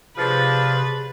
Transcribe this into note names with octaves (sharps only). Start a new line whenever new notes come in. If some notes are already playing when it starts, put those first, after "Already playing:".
C3 F3 D4 G#4 B4 A6